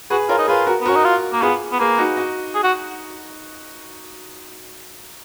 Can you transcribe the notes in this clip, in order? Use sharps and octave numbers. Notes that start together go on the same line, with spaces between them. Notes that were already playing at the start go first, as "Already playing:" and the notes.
F#4 G#4 B4
F4 A#4 C#5
D#4
F4 G#4 B4
F#4 A#4
B3
C#4 F#4 A#4
D#4
F4
A#3
B3 F4 G#4
B3
A#3 G#4 B4
D#4 F#4
D#4 F#4
G#4
F#4